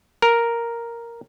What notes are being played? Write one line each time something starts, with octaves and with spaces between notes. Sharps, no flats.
A#4